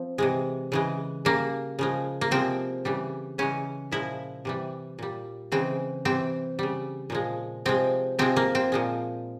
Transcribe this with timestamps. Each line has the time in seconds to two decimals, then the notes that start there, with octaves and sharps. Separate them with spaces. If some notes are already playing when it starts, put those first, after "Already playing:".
Already playing: F3 C4
0.18 C3 E3 G#3
0.72 C#3 E3 G#3
1.25 C#3 G3 A#3
1.79 C#3 F3 G#3
2.21 A#3
2.31 C3 F3 G#3 C4
2.85 C#3 E3 G3
3.38 C#3 E3 G#3 C#4
3.92 A#2 F3 G#3 E4
4.45 C3 E3 G3
4.99 A#2 G3
5.52 C#3 E3 G#3 C4
6.05 C3 E3 G3 C4
6.59 C#3 G3
7.10 A#2 F3 G#3
7.65 C3 F3 G#3 C4
8.19 C3 F3 G#3 C4
8.36 A#3
8.55 C4
8.72 A#2 F3 G#3